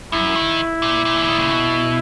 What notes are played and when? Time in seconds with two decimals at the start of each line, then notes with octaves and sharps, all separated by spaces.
0.12 F#2 E4
0.36 D#3
0.82 A#2
1.05 A#2
1.16 E3
1.28 D#3
1.39 C#3
1.51 B2